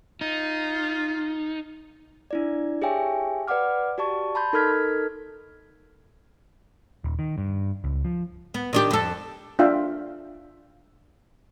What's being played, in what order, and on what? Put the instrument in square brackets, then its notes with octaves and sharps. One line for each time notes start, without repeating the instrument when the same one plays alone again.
[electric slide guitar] D#4 [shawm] F4
[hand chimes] D4 E4 D5
G4 G#4 C#5 E5 G5 G#5
B4 D5 F5 F#5 D6 F6
F#4 G4 D5 A5 C#6
A5 B5 C6 G6
D#4 A4 A#4 F6 G#6 B6
[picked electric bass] D#1
D#3
G2
C#2
F3
[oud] B3
D#3 D4 G4
F2 A4
[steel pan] D4 F4 E5 F5 G5